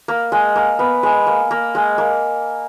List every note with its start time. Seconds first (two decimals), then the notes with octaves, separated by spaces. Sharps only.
0.08 A#3
0.32 G#3
0.56 A#3
0.79 B3
1.03 G#3
1.27 A#3
1.51 A#3
1.75 G#3
1.98 A#3